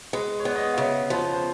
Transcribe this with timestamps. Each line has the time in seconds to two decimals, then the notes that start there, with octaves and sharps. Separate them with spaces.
0.13 G#3 B4
0.40 C#5
0.45 B3 D5
0.56 D#5
0.74 F5
0.77 C#3 E5
1.10 F3 B4
1.33 C5